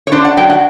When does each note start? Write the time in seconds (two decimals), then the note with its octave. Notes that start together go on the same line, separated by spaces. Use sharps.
0.07 C#5
0.12 D4 C5
0.25 F#5
0.37 F#3 G5
0.50 F#5